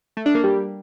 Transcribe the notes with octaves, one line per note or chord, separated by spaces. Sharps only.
A3
D4
A#3
G3